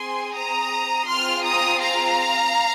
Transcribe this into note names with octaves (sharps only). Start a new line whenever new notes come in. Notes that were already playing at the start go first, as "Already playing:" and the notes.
Already playing: C4 G#4 G#5 C6
A#5 D#6
C4 F4 G#4 C6 F6
A#5 D#6
F5 A#5